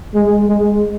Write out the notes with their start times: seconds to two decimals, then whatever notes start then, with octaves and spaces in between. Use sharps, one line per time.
0.15 G#3
0.48 G#3